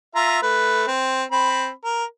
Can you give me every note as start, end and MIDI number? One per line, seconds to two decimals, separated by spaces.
0.15 0.38 65
0.15 0.38 76
0.15 0.38 82
0.42 0.86 57
0.42 0.86 71
0.88 1.23 60
1.32 1.70 60
1.32 1.70 83
1.85 2.04 70